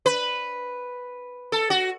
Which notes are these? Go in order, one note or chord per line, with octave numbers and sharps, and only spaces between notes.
B4
A4
F#4